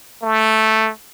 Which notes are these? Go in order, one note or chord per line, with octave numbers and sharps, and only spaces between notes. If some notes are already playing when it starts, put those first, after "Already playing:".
A3